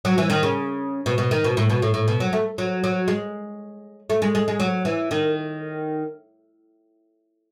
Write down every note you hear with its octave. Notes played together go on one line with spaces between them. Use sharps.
F#3
E3
D#3
C#3
B2
B2
D#3
B2
A2
B2
A2
A2
B2
F#3
A3
F#3
F#3
G#3
A3
G#3
G#3
G#3
F#3
E3
D#3